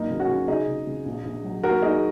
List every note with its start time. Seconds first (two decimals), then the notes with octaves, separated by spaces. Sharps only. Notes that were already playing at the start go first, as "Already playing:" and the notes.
Already playing: G#1 F#3 A#3 D#4
0.10 C#2
0.20 C#4 F#4
0.29 C#2
0.48 C#3 D#4 G#4
0.68 C#3
0.87 C#2
1.06 A#1
1.25 A#1
1.44 F#3
1.63 D#2 F#4 A#4
1.82 D#2 D#4 G#4